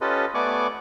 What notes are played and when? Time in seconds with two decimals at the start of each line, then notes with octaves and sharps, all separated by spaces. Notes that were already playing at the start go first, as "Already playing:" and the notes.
0.01 C#4 F4 G4 A4 B4 D#5
0.34 A3 B3 D5 G#5 C#6 D6